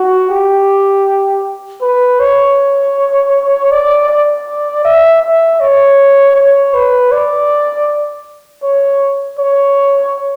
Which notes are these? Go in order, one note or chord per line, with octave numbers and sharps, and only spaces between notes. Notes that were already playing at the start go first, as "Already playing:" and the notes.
Already playing: F#4
G4
B4
C#5
D5
D5
E5
E5
C#5
C#5
B4
D5
C#5
C#5